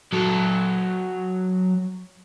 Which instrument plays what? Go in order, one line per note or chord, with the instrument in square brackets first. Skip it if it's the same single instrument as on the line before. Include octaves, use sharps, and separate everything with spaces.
[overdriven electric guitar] F#3 A4